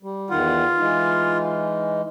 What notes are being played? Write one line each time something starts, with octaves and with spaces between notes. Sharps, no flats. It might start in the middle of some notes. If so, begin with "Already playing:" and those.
G3
E2 D#3 F4 F#5
E3 G#3 D#4